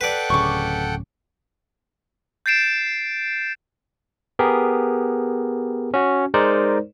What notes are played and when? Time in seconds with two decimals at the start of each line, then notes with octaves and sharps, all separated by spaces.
0.01 A4 B4 D5 F#5 G5
0.30 D1 C#3 C#6 D6
2.46 G6 A6 C7 D7 E7
4.39 B3 G4 G#4 A#4
5.94 C#4 F#4
6.34 G#3 D#4 A#4 C5 D5